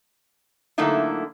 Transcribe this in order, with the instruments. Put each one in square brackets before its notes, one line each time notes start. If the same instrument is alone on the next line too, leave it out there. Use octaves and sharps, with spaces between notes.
[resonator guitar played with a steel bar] D3 F#3 A3 A#3 D#4 E4